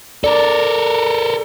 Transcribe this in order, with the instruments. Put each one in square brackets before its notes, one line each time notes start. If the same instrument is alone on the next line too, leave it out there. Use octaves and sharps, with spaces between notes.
[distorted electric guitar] A4 A#4 [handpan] D5